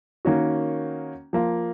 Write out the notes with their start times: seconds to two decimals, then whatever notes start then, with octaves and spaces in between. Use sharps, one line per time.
0.25 D#3 A#3 C#4 F#4
1.33 F3 A#3 F4